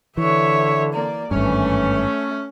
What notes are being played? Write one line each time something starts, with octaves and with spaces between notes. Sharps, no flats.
D3 E3 C#5 E5
A#3 D5
G#1 G2 E3 A3 C#4